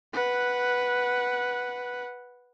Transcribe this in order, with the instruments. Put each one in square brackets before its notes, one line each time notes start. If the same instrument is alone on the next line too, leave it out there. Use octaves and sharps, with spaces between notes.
[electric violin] B4 F#5